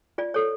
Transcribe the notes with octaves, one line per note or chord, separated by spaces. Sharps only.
F4 D5
A4 C#5